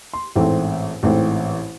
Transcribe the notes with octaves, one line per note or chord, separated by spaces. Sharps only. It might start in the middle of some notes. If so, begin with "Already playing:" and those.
C6
A1 G#2 E3 A3 C4
A1 G#2 E3 A3 C4